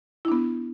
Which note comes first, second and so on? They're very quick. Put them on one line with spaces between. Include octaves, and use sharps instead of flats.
E4 D4 B3